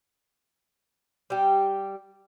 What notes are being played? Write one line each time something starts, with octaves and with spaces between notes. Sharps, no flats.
G3 G4